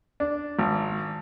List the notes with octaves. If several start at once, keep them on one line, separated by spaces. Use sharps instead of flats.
D4
G#1